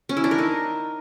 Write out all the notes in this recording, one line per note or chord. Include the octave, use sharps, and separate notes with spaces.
C#4
E4
D4
A#4
D#4